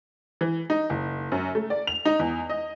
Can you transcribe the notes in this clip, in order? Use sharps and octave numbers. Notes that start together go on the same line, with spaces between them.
E3
D#4
F#1
F#2
A3
D5
F7
D#4
E2
D#5